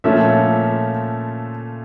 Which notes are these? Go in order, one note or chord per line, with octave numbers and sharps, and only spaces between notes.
A#2 F3 A3 C#4 E5